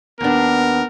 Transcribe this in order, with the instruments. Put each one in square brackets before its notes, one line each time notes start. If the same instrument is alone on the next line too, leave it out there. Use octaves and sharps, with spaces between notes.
[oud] D#2 D4 [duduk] B3 [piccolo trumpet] A#4